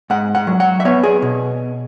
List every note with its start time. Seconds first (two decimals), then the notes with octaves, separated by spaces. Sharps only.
0.10 G#2 F#5
0.35 F#5
0.47 F#3
0.60 F#5
0.80 E5
0.85 B3 C#5
1.03 G#4
1.22 B2